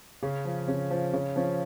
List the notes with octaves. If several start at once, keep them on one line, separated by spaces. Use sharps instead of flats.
C#3 C#4
F3
C#3 C#4
F3
C#3 C#4
F3 C#4